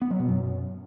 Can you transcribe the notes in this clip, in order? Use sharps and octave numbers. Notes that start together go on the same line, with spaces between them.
B3
F#3
B2
F#2